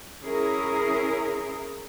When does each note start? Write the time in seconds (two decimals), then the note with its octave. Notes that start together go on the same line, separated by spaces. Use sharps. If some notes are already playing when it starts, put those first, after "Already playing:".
0.23 C#4 E4 G#4 A#4